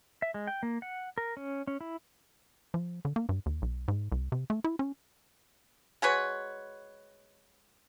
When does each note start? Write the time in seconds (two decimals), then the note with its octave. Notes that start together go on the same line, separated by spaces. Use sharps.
0.22 E5
0.34 G#3
0.47 G5
0.63 A#3
0.82 F#5
1.18 A#4
1.37 C#4
1.67 C#4
1.81 E4
2.74 F3
3.05 D3
3.16 A#3
3.29 G2
3.46 D#2
3.62 B1
3.88 G#2
4.12 C2
4.32 C3
4.50 A3
4.64 E4
4.79 C#4
6.02 G#3 F#4 B4 C#5